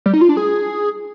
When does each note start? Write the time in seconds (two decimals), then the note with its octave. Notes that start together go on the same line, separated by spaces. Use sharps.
0.06 G3
0.14 D#4
0.21 F4
0.29 D4
0.37 G#4